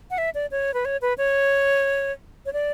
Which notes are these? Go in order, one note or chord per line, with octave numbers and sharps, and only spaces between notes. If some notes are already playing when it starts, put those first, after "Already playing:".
F#5
E5
D5
C#5
B4
C#5
B4
C#5
C#5
D5